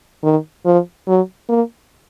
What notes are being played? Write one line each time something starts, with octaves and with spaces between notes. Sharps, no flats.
D#3
F3
F#3
A#3